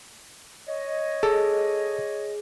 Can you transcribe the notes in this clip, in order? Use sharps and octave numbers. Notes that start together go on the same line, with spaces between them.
C#5 D#5
G#4 A4